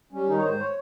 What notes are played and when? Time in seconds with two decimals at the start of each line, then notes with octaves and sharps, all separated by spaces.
0.12 G3 C#4
0.28 D#3 D#4
0.38 C#5
0.44 G#2 C5
0.59 C#5